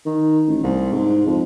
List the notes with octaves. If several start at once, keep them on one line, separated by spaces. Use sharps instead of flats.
D#3
A1
C2
G#2
F2